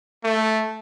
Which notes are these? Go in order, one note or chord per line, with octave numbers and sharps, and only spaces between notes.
A3